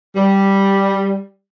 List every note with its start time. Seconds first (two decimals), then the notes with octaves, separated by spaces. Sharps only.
0.16 G3